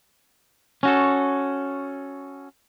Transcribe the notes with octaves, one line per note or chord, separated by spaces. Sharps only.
C#4 F#4 A4